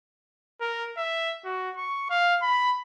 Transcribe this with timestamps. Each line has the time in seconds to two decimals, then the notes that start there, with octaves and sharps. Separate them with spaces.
0.61 A#4
0.97 E5
1.45 F#4
1.77 C#6
2.10 F5
2.42 B5